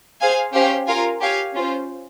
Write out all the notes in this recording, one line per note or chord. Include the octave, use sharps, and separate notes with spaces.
G#4 C5 F5 G#5
C#4 G4 C5 F5
F4 A#4 F5 G#5
G4 C#5 F5 G#5
C#4 F4 C5